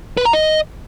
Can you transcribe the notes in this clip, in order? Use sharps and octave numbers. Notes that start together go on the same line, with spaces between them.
B4
A#5
D#5